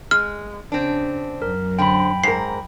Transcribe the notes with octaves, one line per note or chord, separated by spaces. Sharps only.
G#3 F6
C#3 C4 D4
F#2 F#3 A#4
D3 C4 G5 B5
G#2 A#4 C7